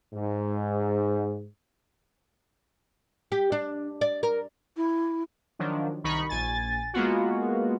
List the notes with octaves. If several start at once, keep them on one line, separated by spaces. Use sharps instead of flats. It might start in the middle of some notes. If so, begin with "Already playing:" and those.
G#2
G4
D4
D5
A#4
E4
D#3 F3 F#3 D4
C2 D#3 D#4 B5 C#6
A#1 G#5 A6
G#3 A#3 B3 F4 F#4